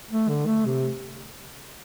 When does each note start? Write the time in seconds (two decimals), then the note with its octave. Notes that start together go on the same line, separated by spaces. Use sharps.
0.11 A3
0.29 D3
0.47 A3
0.66 C3